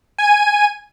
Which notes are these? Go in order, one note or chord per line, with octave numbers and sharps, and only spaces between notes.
G#5 D#7